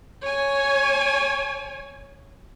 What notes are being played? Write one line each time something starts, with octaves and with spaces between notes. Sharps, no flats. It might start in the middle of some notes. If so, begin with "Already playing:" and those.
C#5 G#5